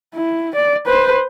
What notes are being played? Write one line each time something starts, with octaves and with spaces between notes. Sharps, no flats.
E4
D5
B4 C5